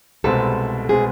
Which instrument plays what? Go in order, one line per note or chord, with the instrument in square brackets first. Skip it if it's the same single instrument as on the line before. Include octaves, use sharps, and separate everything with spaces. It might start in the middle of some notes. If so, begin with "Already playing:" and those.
[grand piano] C2 B2 G#3 C4 [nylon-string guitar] A4
[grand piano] B2 G#3 C4 [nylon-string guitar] G#4